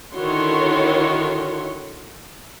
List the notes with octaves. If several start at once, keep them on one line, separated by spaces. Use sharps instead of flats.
D3 D#3 E4 F#4 C#5 C6